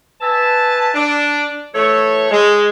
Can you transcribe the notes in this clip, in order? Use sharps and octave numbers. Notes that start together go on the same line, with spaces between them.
B4 E5 G#5 A5
D4
E3 A3 C#5
G#3